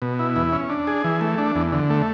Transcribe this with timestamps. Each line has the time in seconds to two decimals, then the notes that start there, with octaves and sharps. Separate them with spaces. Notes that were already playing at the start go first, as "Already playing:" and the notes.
0.02 B2
0.19 E4
0.36 E2
0.53 C#4
0.70 D4
0.87 G#4
1.05 E3
1.21 A3
1.38 D4
1.56 E2
1.72 D3
1.90 A3